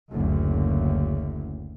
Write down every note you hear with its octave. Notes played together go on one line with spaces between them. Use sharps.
F#1 D2